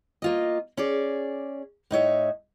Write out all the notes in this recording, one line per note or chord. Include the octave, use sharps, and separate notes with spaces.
A#3 F4 D#5
C#4 G#4 D5
A2 D#4 C#5 E5